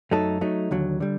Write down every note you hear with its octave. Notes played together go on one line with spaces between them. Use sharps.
F#2 F#3 A3 D#4 A4
F#3 A3 D#4
D#2 D3 F#3
D3 G3